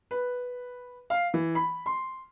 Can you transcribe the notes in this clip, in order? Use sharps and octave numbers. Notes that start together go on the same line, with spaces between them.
B4
F5
E3
B5
C6